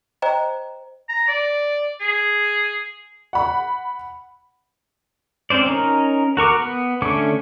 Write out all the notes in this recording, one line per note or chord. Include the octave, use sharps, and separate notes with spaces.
C5 D#5 G5 A#5
A#5
D5
G#4
F#5 B5
C4 C#4 C5 D5
C#4 D#4 A#4
F#4 A#4 C#6 D6
B3
D3 A3 C#4 C#5 D6